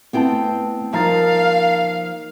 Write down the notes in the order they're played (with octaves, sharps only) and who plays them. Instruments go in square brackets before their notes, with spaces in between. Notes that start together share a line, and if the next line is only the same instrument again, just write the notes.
[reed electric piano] A3 E4 A5 [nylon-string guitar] B3 C4 G5
[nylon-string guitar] F3 [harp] A#3 D#4 [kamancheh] F5 [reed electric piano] A5 A#5 A6